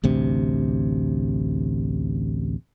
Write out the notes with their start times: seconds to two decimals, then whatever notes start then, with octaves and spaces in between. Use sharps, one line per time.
0.04 A1 D2 C3